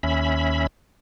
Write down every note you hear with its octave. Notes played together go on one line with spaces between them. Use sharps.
D#2 C#4 E5 B5